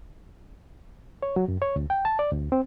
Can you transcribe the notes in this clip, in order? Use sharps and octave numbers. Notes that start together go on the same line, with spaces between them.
C#5
F#3
F#2
C#5
D2
G5
A5
D5
D2
C4